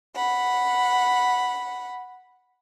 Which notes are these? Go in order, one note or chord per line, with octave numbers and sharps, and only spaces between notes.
F#5 B5